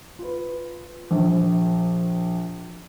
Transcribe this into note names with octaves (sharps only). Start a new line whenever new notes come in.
F4 B4
A#1